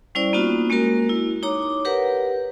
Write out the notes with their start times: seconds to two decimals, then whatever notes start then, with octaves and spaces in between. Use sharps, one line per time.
0.15 G3 C#4 E4 C5 D5
0.33 A#3 B3 C#4 D#4 F4 F#4
0.70 G#3 A#3 F#4 A#4
1.09 E4
1.43 D#4 C#5 A#5 D6
1.85 G4 A#4 B4 F#5